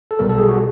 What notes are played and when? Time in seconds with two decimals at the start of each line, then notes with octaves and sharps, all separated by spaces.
0.11 A4
0.19 B1 B2 G3 B3 A#4
0.29 A4
0.38 G#4
0.48 F#4